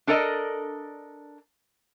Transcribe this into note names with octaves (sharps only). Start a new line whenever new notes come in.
D4 A4 A#4 D5 D#5